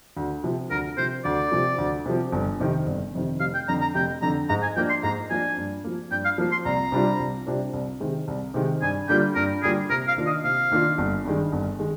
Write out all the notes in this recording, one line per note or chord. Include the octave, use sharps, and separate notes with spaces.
D2
C3 F3
D2 A#4
C3 F3 C5
D2 D5
C3 F3
D2
C3 F3
G1
F2 C3 D#3
G1
F2 C3 D#3
F1 F5
G5
F2 D3 A#5
A#5
F1 G5
F2 D3 A#5
G#2 A#5
G#5
F3 A#3 D4 G5
C6
G#2 A#5
F3 A#3 D4 G#5
G2
F3 A#3
G2 G5
F5
F3 A#3
C6
C2 A#5
C3 G3 D4 F4
C2
C3 G3 D4 F4
C2
C3 D#3 G#3
C2
C3 D#3 G#3
G2 G#5
D3 G3 A#3 F4 G5
G2 A#4
D3 G3 A#3 F4 G#4
C3 A#4
F5
D#3 A#3 D4 F4
D#5
C3 F5
D#3 A#3 D4 F4
G1
G2 D#3 G#3
G1
D#3 G#3